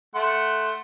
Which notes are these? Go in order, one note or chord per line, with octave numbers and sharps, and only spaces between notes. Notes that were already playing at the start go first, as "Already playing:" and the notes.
A3 F#5 C6